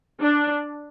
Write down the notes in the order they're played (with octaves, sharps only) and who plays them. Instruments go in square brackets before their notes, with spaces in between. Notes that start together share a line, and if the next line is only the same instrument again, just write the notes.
[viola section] D4